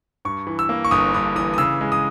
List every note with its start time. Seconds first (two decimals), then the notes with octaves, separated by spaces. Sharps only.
0.25 G2 C#6
0.47 E3
0.59 E6
0.69 A#3
0.85 C#6
0.91 G1 D#6
1.14 G2 D#6
1.36 E3 D#6
1.54 D#6
1.58 C#3 E6
1.81 G#3
1.92 D#6